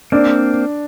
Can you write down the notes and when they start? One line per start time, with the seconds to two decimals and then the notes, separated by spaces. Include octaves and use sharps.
0.12 A#3 C4 D4